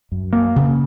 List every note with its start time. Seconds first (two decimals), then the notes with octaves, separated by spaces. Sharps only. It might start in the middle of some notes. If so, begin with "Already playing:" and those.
0.12 F#2
0.33 A#3
0.56 C#3